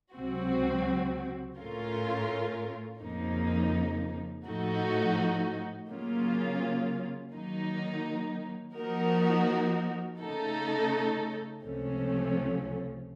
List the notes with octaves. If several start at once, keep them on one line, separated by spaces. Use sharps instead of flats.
C#2 C3 F#3 C4 F#4
A2 A3 C#4 F4 A#4
F2 C#3 F3 A#3 D#4
A2 F3 A3 D#4 F#4
C#3 F#3 A#3 C#4 F4
D#3 F#3 A#3 D#4
F3 A#3 D#4 F#4 A#4
C#3 A3 D#4 A4
C#2 C3 F3 A3 C#4